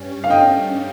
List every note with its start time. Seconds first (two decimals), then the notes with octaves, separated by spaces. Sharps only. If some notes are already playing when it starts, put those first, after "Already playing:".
Already playing: G2 G3 C#4
0.24 F5
0.30 D#5 G5